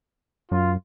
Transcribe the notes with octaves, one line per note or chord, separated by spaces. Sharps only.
F#2 F4